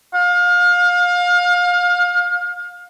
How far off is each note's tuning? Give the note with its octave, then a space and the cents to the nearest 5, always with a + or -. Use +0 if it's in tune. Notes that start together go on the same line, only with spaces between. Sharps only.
F5 +30